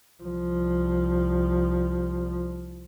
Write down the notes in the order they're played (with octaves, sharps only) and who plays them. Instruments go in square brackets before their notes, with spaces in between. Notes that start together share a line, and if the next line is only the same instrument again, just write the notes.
[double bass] C2 F3